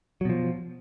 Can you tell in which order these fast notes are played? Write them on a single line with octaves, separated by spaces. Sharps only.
F#3 B2 F3